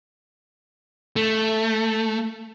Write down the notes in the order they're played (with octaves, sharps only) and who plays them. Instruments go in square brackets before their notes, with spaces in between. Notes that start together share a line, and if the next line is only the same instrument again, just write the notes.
[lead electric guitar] A3